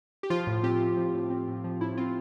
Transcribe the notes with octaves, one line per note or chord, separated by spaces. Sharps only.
G4
F3 F4
A2
C4 G4
A2
F3
A2
C4
A2
F3
A2 E4
C4 F4